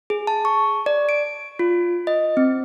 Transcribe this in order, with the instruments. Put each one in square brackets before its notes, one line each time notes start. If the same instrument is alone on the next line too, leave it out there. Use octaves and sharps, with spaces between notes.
[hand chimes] G#4
A5
C#6
D5
D7
F4
D#5
C4